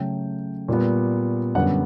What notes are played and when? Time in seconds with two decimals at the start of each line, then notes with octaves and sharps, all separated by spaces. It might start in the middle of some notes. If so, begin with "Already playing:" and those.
Already playing: C#3 F#3 A3 G5
0.68 A#2 G3 B3
1.55 F#2 D3 G3 B3 F#5